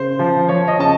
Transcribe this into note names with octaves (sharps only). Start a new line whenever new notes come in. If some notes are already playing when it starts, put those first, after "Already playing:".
Already playing: C#3 C5
F3
F3 C#5
D#5
C#3 A5